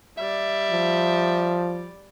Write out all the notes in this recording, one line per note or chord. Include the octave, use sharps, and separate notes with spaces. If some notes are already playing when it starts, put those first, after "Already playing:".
G3 D5 E5
F3